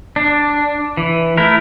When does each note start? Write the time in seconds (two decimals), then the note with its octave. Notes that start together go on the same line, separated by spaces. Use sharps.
0.16 D4
0.97 E3
1.37 A3 E4 A#4